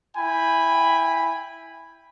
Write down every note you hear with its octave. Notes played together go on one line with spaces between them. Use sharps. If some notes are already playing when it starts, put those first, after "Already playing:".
E4 G5 G#5 B5